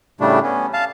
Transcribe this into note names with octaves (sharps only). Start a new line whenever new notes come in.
A2 C#3 G3 A3 D4
B3 C#4
F5 A5